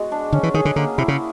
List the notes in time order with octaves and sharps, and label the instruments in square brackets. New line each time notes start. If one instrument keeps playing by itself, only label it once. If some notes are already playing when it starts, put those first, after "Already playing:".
Already playing: [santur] G#3 B3 F#4
D4
[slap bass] D3 [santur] C#4
[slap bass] E3
[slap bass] D#3 [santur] G#4
[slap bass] D3
[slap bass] D3 [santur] A#3
[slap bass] C3 [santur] E4
[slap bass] C#3